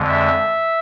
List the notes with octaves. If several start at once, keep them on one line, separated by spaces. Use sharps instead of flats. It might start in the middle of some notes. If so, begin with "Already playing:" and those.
Already playing: F2 D3 G#3
E5